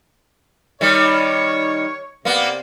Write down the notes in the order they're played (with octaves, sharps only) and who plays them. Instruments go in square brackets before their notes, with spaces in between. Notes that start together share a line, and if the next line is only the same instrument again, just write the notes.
[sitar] D#3 G3 [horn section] C#5
[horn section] C3 D5 [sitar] A#3 B3